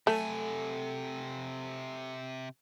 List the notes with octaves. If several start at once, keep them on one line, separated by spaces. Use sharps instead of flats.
C3 F#3 A3 A4 G#5